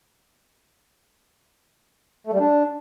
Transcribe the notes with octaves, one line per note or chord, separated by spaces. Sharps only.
A3
G3
D4